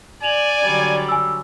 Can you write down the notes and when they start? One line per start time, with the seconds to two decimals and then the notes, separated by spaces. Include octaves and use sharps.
0.23 D5 G#5 F7 F#7
0.65 D3 F#3 G3
1.09 G#5 E6